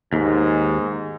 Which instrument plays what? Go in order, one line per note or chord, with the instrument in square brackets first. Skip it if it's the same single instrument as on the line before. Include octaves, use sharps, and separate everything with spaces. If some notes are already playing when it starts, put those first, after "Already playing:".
[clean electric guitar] D#2 [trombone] G#2